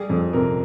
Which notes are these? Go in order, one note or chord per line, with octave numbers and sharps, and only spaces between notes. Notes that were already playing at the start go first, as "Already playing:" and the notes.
Already playing: G3 G#4
F2
C3 A#4